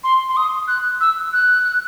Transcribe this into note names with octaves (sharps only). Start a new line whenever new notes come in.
C6
C6
D#6
F#6
E6
F#6